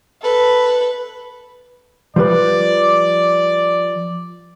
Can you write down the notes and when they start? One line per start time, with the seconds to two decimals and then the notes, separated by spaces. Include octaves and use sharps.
0.22 A4 B4
2.16 F3 G3 B4 D5